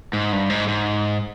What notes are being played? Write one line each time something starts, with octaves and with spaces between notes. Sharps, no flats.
G#2
G2
G#2
G#2